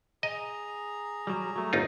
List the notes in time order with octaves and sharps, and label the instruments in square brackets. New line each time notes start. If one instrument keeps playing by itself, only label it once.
[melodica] G#4 A#5 [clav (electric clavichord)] D#5
[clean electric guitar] F#3 G3
F#3 A3
[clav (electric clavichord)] G1 D#4 F4